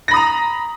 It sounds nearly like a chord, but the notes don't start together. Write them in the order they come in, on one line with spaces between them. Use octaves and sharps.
A#6 B5 D#6 A#5